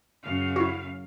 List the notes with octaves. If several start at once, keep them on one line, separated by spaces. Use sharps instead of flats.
F#2 C#3 F5
E4 F#4